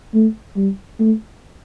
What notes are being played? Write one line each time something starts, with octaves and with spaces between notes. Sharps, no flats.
A3
G3
A3